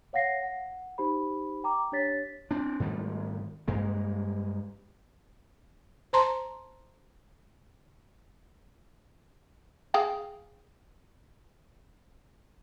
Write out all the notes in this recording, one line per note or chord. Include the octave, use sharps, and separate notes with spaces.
C#5 F5 F#5 A#6 C7
F#5
D#4 G4 C5 B5
G5 A#5 D6
D4 G4 C#5 A6 B6
C4 D4
G#2 D#3 G3 A3
G2 G#3 A#3
C5 A5 A#5 C6
G#4 F5 G5